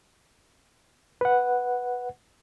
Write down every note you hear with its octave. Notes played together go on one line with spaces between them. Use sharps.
B4 F#5